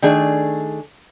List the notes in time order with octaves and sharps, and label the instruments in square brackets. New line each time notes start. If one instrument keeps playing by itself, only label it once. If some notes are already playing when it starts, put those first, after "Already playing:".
[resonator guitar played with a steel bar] D#3 A3 D4 G#4